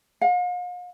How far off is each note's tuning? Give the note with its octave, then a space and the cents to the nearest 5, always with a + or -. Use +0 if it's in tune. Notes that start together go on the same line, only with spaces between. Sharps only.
F5 +45